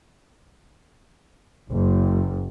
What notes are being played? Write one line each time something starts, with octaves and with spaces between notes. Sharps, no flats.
F#1